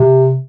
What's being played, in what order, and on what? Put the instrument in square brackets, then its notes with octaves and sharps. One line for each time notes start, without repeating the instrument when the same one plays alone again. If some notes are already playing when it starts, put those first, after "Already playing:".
Already playing: [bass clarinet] C3